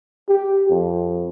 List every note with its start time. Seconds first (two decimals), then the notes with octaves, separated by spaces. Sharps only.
0.29 G4
0.70 F2